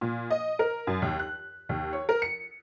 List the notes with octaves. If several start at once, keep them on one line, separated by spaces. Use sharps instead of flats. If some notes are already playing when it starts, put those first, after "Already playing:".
A#2
D#5
A#4
F#2
D#2
F#6
D#2
C#5
A#4
C#7